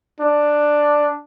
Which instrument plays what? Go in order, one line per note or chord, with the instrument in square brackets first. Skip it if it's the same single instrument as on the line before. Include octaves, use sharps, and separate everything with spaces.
[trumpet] D4